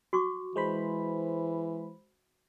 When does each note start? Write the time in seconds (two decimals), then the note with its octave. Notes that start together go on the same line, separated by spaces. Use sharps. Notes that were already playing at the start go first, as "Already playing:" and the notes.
0.13 F#4 C#6 D6
0.56 E3 G#3 C5 B5